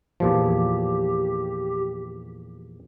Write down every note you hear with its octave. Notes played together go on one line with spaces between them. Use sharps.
E2 A#2 F3 G4